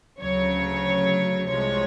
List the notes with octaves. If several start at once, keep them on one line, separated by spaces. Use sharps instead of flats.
D2 C#3 F#3 C#5
C2 C3 F3 G#3 C#5